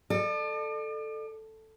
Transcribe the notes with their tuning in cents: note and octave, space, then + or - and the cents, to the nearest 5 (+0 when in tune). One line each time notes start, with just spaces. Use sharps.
A4 +0 D5 +40